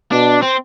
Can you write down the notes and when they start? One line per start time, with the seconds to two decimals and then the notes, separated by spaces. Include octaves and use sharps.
0.12 B2 D4
0.42 C4